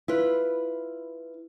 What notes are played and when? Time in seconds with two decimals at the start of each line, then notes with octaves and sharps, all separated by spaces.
0.08 E4 F4 B4